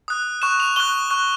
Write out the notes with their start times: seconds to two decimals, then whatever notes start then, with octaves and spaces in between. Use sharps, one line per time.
0.08 D#6 F#6
0.42 C#6 F#6 E7
0.60 F7
0.76 C#6 F#6 G7
1.11 C#6 F#6